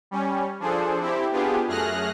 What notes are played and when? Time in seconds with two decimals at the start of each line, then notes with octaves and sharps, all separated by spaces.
0.11 G3 C#4
0.59 F3 D4 G#4 A4 C5
1.00 C4 E4 G4
1.31 B3 D4 F4 G4 G#4
1.67 F#2 A3 G#4 F6 F#6 A#6